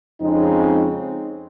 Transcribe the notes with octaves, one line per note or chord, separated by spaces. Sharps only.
F2 C#3 G#3 C4 D#4